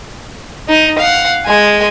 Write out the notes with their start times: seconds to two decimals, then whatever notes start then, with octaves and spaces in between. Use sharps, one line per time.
0.68 D#4
0.98 F5 F#5
1.46 G#3 G#5